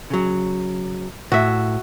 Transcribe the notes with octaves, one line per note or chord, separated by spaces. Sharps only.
C#3 F#3
A2 F#4 E5